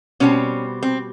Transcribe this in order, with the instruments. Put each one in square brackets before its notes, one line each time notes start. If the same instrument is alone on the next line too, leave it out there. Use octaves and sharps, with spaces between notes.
[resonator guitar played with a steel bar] B2 G3 C4 C#4
C4